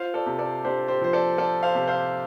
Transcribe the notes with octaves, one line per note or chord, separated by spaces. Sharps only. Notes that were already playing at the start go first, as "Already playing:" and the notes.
Already playing: F4 C5 F5
A4 D5
C3
A4 D5
D4 G4 C5
G4 C5
F3 C5
A4 D5
F4 A4 D5
C5 F5
C3
C5 F5